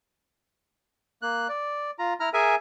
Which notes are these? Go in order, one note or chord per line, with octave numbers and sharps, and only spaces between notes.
A#3 F#6
D5
F4 A#5
E4 A#5 F6
G#4 A#4 E5 G#5